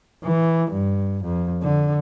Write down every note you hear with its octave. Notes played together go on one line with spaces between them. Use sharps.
E3
G2
F2
D3